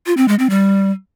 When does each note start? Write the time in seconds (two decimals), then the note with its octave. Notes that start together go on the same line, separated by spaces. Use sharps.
0.06 F4
0.17 C4
0.28 G#3
0.39 C4
0.50 G3